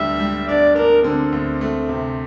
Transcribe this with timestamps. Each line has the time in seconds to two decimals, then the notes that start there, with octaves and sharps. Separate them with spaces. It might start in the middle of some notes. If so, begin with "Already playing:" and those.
Already playing: D2 G3 D4 E5
0.20 G3
0.49 D4 D5
0.76 D4 A#4
1.04 D3 C4
1.32 D2
1.61 A3
1.89 C3